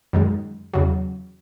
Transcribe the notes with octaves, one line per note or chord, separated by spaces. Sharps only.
F#2 D#3 G#3
E2 C#3 F#3